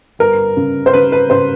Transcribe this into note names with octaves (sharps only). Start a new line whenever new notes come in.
G1 A#4
C#3
C5
C#3 B4
B4
C#3 C5